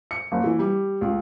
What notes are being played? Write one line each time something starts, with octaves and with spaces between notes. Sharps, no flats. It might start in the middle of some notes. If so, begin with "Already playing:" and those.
C#7
F#1
E3
G3
C#2